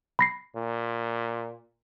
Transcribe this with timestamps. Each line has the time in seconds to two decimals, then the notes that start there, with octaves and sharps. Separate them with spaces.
0.19 B5 A#6 C7
0.56 A#2